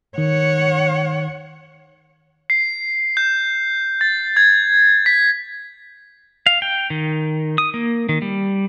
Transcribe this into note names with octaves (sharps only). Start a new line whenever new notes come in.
D#3 C#5 F#5
C7
G6
A6
G#6
B6
F5
G5
D#3
D#6
A#3
D#3
G3